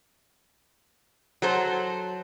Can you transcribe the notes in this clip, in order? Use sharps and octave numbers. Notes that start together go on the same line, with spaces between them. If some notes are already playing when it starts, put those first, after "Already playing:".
F#3 A4 C5